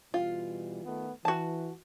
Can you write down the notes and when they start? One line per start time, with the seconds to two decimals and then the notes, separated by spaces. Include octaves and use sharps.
0.14 B2 E3 G3 F4
0.85 D#3 A3 B3
1.25 E3 F#4 A5